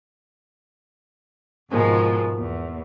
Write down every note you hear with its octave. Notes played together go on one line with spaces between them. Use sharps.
G#2 B2 D#3 F3 G#3
E2